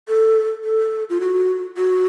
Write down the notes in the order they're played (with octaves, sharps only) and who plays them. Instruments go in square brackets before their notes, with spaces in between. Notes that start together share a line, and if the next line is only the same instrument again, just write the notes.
[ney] A4
A4
F4
F#4
F#4